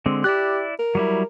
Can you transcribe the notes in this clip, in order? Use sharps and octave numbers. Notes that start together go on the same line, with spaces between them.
D3 G#3 C4
E4 G4 D5 F#6
A#4
F#3 G3 E4